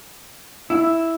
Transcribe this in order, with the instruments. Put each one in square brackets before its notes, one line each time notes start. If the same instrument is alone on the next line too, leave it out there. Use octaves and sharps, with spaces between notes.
[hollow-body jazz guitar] E4